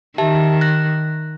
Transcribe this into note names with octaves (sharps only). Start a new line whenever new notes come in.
D#3 G4 E5 A5
F#6 A#6